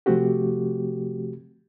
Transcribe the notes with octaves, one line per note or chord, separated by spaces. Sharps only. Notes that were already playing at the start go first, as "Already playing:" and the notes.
C3 F3 A3 C4 F#4 G4